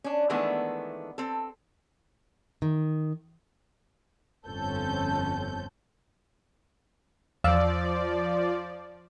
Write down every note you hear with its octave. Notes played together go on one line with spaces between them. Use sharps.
C#4 D4
D#3 E3 G#3 A3 B3 D4
C4 A4
D#3
G1 F2 C4 C#4 A4 G6
E2 F3 D5 F5 E6